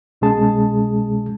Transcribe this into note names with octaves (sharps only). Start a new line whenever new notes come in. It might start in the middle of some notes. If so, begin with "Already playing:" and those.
C2 B2 G#3 C#4 G#4 A5